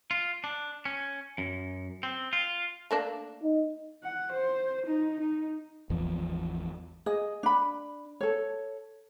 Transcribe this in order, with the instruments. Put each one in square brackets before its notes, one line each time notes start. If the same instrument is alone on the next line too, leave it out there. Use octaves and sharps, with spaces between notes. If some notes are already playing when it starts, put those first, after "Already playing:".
[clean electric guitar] F4
D4
C#4
F#2
C4
F4
[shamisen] A3 A#3 D4
[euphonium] D#4
[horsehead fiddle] F#5
C5
D#4
D#4
[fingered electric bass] G#1 E2 E3 F3
[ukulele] G#4 D#5
D4 B5
A4 C#5